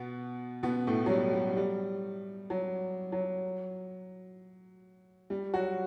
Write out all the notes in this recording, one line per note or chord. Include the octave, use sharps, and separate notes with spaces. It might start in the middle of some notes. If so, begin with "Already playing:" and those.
Already playing: B2 B3
B2 B3
A2 A3
F#3
G3
G3
G3
F#3
F#3
G3
F#3 F#4